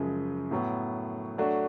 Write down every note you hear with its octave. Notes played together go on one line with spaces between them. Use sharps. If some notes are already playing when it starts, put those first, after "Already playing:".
Already playing: F#2 C#3 F3 G#3
A2 F#3 B3
F#3 A3 D4 F#4